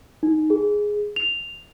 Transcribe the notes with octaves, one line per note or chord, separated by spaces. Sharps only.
D#4
G#4
F7